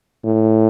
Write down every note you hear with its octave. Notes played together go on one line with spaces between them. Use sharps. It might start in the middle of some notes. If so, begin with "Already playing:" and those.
A2